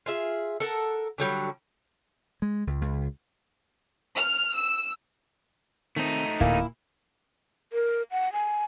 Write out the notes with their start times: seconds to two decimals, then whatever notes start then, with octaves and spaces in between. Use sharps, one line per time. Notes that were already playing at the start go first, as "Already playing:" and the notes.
0.06 F4 G#4 E5
0.60 A4 A#4 F#5
1.18 D3 F#3 G3
2.42 G#3
2.67 C#2
2.81 C#2
4.17 F6
4.54 E6
5.96 D#3 A3 C4 D#4
6.40 D1 A#2 A#3 E4
7.73 A#4
8.11 F#5
8.33 G#5